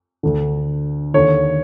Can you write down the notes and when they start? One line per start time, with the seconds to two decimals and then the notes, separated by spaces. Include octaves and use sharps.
0.23 D2 D3
1.14 D#2 D3 C#5